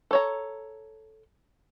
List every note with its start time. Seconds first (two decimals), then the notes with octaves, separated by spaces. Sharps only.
0.11 A4 C#5 A#5